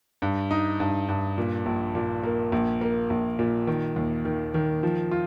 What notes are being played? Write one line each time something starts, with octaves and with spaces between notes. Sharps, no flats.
G2
D#4
G2
G2
A#2
A#1
A#2
A#3
A#1
A#3
A#1
A#2
D#3
D#2
D#3
D#3
F3
F4